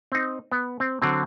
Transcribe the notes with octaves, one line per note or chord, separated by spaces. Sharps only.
C4 D#4
B3
C4
D3 F#3 C4